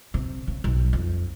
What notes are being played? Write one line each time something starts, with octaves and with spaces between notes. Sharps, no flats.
C3
C#3
B1
F2